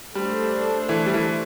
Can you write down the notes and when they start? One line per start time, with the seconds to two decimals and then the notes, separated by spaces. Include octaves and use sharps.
0.15 G3 A3 D4 A4 C5
0.89 E3
1.06 G3
1.14 E3